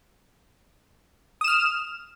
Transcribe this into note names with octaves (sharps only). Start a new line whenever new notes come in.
D#6 F6 E7